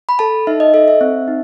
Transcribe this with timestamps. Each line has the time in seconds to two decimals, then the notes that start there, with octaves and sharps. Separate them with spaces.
0.09 B5
0.19 A4 A5
0.47 D#4 E5
0.60 D#5
0.74 A4 E5
0.88 E5
1.01 C4
1.28 D#4